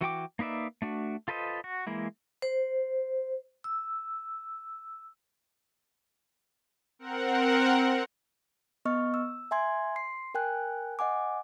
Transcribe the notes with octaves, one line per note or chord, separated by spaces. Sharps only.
E3 F#4 G5 D6
A#3 D#4 B4 D5 E5
A3 D4 F#4
F4 A4 B4 C5 D#5
F#4
E3 G#3 A#3 E4
C5
E6
C4 A#4 F#5
B3 D#5 C#6 F6
E6
E5 G#5 C6 G#6
C6 C7
A#4 G5 G#5 F#6
D#5 F#5 G#5 D6